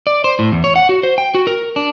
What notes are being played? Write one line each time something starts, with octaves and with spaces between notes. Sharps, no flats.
D5
C5
A2
E2
C#5
F#5
F#4
C5
G5
F#4
A#4
D4